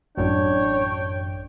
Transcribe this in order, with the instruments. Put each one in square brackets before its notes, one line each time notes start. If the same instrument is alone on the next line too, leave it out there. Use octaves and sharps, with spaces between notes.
[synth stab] A1 F#2 [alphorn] D4 [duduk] C#5 [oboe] G5